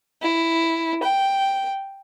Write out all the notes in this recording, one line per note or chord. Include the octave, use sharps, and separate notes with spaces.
E4
G5